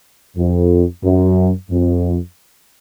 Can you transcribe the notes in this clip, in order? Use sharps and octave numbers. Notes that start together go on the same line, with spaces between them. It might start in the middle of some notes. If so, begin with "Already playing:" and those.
F2
F#2
F2